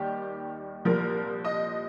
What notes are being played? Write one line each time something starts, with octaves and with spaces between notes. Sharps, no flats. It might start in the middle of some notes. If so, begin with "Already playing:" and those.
Already playing: D#2 D#3 G3 G4
C2 A#2 F3 A#4
D#5